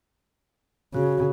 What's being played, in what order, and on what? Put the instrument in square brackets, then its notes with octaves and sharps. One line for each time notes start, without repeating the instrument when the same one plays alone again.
[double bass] C#3 [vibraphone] F#4